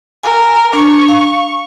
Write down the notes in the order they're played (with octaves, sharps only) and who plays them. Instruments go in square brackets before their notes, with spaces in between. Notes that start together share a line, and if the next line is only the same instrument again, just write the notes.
[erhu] A#4 [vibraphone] G#5
[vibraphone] D4 [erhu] C#6
[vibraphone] F5